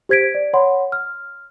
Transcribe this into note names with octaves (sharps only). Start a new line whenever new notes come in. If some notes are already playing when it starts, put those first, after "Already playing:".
G4 C5 G#6 B6 D7
D5
C#5 F#5 B5 C6
F6